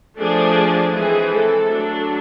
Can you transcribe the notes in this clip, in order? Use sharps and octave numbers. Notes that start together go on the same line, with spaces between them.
F3 A3 D4 G#4
E3 G#3 C4 G#4
A4
F#3 A3 D4